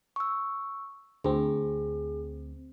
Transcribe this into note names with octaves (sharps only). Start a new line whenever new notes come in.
C#6 E6
D2 C4 G#4